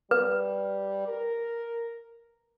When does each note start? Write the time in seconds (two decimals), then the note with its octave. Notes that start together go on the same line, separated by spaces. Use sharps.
0.11 G3 B4
1.08 A#4